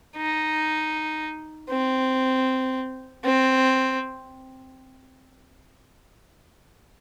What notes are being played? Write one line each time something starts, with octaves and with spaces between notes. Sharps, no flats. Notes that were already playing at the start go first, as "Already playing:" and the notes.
D#4
C4
C4